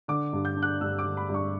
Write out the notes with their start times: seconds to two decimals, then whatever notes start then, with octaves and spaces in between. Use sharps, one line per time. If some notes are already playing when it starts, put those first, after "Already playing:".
0.08 D3 D6
0.33 G2
0.45 G6
0.56 D4
0.62 F#6
0.81 G2 E6
0.98 D6
1.05 D3
1.17 B5
1.29 G2 C#6